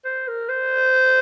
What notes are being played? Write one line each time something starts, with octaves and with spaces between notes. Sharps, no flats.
C5
A#4
C5